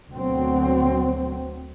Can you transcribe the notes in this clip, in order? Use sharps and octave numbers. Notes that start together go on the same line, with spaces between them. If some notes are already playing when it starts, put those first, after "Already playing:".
D2 B2 F#3 C4